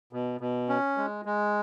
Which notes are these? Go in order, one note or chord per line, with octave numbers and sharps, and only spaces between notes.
B2
B2
C#4
G#3
G#3